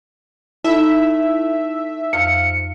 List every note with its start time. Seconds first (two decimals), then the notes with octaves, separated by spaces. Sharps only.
0.64 A3 D#4 E4 A4 E5 B5
2.13 F2 F3 F4 C#7